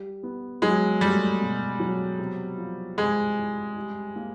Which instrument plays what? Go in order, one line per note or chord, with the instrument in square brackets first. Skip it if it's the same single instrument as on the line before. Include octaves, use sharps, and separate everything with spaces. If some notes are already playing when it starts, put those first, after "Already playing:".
Already playing: [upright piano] G3
B3
[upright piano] F#3 [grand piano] G#3
[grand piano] G3 [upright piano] A3
[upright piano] B2
F#3
C3
F3
[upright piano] C3 [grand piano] G#3
[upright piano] E3
G3
A#3